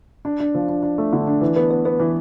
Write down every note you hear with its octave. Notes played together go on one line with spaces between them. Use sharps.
D4
D4
F3
D4
D4
A3
D3
D4
E3
B3
B3
B3
E3